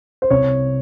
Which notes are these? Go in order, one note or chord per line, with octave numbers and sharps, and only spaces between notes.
C5
C2 C#5